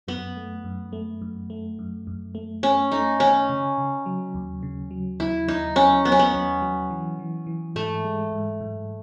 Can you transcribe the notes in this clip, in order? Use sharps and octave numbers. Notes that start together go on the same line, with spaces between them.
F#2 B3
A3
F#2
A3
F#2
A3
F#2
F#2
A3
A3 C#4
A3 D#4
D#3 C#4
C#3
C#3
F#3
D#2
C#3
F#3
D#2 E4
D#2 D#4
F#3 C#4
F#3 B3
C#4
B3
D#2
F#3
E3
E3
E3
G#2 A3
G#3
G#2
G#2